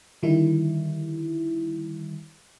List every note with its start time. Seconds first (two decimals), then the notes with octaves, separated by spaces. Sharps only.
0.23 D3 D#3 G3 E4